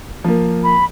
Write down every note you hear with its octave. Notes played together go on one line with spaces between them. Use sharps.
F3 A#3
B5